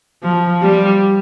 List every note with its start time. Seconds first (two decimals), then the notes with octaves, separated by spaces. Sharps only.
0.23 F3
0.62 G3